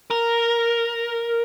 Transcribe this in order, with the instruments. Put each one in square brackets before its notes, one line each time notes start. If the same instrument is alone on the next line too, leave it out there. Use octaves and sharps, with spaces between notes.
[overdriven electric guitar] A#4